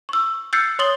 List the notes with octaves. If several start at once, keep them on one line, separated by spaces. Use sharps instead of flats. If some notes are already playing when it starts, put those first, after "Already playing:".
C#6 E6
E6 F#6 G6 A6 C7 C#7
C#5 C6 D#6 A6 F#7 G7